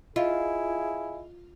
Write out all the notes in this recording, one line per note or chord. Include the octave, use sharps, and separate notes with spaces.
E4 F4 G#4 D#5 F5